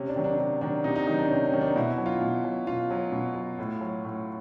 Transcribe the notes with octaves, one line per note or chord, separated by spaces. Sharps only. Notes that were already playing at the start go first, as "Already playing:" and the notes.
Already playing: C3 C#4
D4
D#3 F#3
D4
C3 D4
D#3 F#3 D4
C3 D#4
D#4
D#3 F#3 D#4
D4
C3 C#4
C#4
D#3 F#3
D4
B2 E4
E4
F#3
F4
B2
F#3
B2 F4
F#3
B2
F#3
A2
F#3
A2